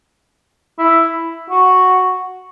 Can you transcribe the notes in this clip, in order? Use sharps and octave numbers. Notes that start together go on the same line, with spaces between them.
E4
F#4